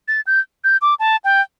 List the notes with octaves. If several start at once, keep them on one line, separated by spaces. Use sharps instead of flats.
A6
G6
G6
D6
A5
G5